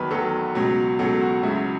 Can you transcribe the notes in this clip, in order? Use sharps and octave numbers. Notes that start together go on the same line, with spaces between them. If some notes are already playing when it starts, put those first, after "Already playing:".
Already playing: E2 D#3 F#3 B4
E2 D#3 F#3 A4
C#2 B2 F#3
C#2 B2 F#3 A4
F#4
C#2 C#3 F#3 E4